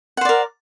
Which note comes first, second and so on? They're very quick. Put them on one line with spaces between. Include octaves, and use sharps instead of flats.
F#5 C5 D5 A#4